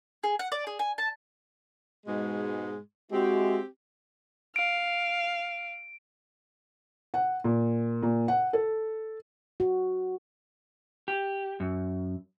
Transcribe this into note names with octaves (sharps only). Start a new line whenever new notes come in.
G#4
F#5
D5
G#4
G#5
A5
G#2 B2 G#3
G#3 C4 E4 F#4 G4
F5 D7
F#5
A#2
A#2
F#5
A4
F#4
G4
F#2